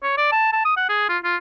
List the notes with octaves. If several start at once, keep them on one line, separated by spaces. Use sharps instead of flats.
C#5
D5
A5
A5
D#6
F#5
G#4
F4
F4